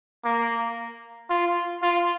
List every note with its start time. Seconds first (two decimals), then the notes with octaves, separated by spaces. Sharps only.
0.25 A#3
1.30 F4
1.83 F4